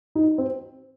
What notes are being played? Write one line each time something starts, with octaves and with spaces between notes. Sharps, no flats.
D#4
C4